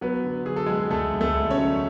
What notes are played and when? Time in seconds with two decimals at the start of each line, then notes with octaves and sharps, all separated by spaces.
0.01 F#3 B3 B4
0.24 D3
0.46 F#3 G#4
0.56 A4
0.66 F#3 G#3 G#4
0.91 D2 A3 A4
1.12 D2
1.21 A3 A4
1.35 D2
1.51 C#4 C#5
1.58 F#3